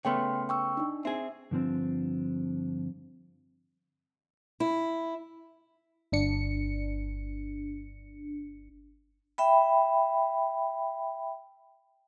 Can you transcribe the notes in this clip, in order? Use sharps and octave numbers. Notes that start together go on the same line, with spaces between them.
C#3 A3 B3 G5 C6 F6
G5 C#6 E6
D4 D#4
C4 G#4 E5
G2 D3 F3 A#3 C4 D4
E4
G1 D4 C#7
E5 G5 B5